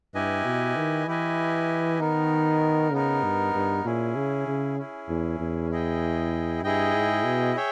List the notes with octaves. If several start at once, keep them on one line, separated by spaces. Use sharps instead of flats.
G2 E4 G4 B4 D#5 G#5
B2
D#3
E3 E4 G4 B4 D#5 G#5
D#3 B3 D#4 A#4
C#3 B3 D#4 A#4
G2
G2
A#2 C#4 E4 G#4
C#3
C#3
C#4 E4 G#4
E2
E2
E4 G#4 D#5 G5
G2 E4 G#4 D#5 G5
G#2
B2
G#4 C#5 E5 G5